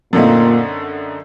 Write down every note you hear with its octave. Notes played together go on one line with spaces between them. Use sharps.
F#2 A#2 D3 A3 C4 D#4